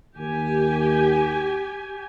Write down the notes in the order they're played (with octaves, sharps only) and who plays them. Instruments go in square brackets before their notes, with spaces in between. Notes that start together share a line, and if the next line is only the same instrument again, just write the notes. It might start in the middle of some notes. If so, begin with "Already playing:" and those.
[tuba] D#2 [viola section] G4 G#5